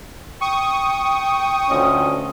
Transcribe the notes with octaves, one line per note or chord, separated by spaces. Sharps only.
G5 C#6 D#6
D2 C#4 F4 D#5